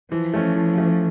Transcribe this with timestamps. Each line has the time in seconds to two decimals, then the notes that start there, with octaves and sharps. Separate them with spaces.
0.11 E3 F3
0.33 A3 C#4
0.56 E3
0.78 A3 C#4